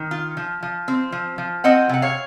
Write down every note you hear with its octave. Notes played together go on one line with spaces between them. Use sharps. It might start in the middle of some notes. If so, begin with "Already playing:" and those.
Already playing: D#3
F4
F3
F3
C4
F3
F3
C4 D#5 F#5
C3 F#5
C#5 F5